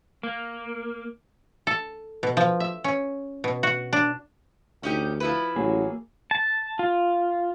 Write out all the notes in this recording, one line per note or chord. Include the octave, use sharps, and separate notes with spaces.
A#3
A4
B2
F3
E5
C#4
B2
F#4
D4
D2 C#4 D#4 G4
F3 E4 B4
A1 F#3 A#3 G#4
A5
F4